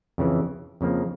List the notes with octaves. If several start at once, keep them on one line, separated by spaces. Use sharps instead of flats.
F2 C#3 E3
F2 C#3 F3 A#3